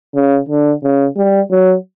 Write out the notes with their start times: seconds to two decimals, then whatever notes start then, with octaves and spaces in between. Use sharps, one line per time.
0.14 C#3
0.49 D3
0.83 C#3
1.17 G3
1.51 F#3